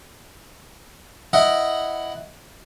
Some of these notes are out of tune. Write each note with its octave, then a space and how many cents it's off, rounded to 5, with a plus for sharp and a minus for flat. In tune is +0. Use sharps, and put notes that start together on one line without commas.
E4 +0 D#5 +0 F#5 +5